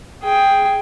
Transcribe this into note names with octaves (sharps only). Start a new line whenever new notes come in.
G#4 G5